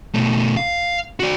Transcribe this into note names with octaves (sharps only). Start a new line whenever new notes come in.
B2 A3
F5
F#4 D5